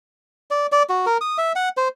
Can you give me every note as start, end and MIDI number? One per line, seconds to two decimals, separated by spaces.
0.51 0.67 74
0.72 0.83 74
0.89 1.05 66
1.06 1.18 70
1.21 1.37 87
1.38 1.52 76
1.56 1.69 78
1.77 1.88 72